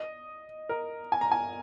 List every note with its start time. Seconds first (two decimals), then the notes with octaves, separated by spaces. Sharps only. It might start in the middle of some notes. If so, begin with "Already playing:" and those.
Already playing: D#5
0.69 A#4
1.12 G#5
1.21 A#5
1.32 G#5